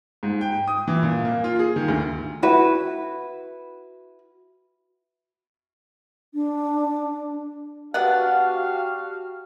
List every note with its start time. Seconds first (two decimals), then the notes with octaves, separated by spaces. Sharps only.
0.23 G#2
0.41 G5
0.68 D#6
0.88 E3
1.03 A#2
1.25 A#3
1.44 F4
1.59 G#4
1.76 D#3
1.88 D2
2.43 E4 F#4 B4
6.34 D4
7.94 B3 D4 F#4 G4 F5 F#5